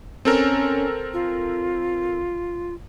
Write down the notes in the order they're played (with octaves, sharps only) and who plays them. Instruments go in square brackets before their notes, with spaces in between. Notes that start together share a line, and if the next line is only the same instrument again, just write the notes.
[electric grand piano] C4 A4 A#4 [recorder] C#4
[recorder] F4